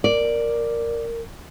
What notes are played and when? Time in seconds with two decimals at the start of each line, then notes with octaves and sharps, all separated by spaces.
0.04 A#4 D5